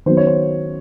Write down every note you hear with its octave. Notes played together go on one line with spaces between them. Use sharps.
D#3 F#3 B3 C5
C#5
C5